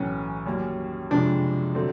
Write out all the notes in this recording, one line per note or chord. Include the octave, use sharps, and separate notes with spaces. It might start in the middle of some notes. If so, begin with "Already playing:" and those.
Already playing: B1 A2 E3 C#4
F#2 D#3 G3 A#3
F#1 F2 C3 F3 G#3 D4
D3 F#3 A3 C4